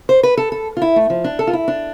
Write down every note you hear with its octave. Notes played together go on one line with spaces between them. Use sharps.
C5
B4
A4
A4
F4
E4
A3
F3
D4
A4
F4
E4
D4